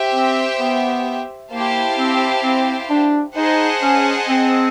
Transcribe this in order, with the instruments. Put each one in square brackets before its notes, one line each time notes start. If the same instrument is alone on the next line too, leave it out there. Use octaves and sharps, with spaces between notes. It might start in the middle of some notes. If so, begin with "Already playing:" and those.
Already playing: [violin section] G4 C5 E5 G5
[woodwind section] C4
B3
[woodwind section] A#3 [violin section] E4 G4 C5 F5 A5
[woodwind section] C4
C4
D4
[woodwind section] D#4 [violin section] G#4 C5 D#5 F#5 A5
[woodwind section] C#4
C4